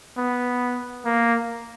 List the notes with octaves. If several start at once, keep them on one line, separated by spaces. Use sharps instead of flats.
B3
A#3